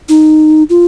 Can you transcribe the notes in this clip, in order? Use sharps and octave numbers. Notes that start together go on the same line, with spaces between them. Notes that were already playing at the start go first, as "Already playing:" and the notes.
D#4
F4